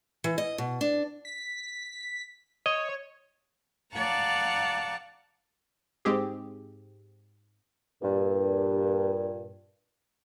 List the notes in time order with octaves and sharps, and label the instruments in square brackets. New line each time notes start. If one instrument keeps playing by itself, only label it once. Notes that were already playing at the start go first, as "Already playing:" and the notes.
[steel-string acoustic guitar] E3
D#5
B2
D4
[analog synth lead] B6
[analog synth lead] C#5 [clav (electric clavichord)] D#5
[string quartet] D5 F5 F#5 A5 A#5 C#6
[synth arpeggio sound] G#2 G#3 C4 G4 G#4
[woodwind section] G2 A#2